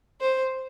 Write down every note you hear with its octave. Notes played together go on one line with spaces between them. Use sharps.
C5